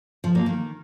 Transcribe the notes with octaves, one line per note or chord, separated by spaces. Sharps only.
F3
A#3
D#3